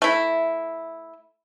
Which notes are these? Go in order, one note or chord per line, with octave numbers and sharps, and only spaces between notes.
A3 E4